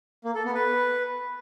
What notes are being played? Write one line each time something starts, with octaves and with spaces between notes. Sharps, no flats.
A#3
A4
B3
B4